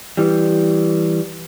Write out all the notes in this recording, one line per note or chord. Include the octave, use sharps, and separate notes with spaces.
E3 G3